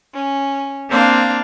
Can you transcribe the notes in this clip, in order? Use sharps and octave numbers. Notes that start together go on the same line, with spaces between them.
C#4
A#3 C4 D4 F5